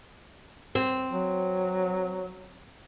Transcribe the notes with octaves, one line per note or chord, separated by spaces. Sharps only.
C4
F#3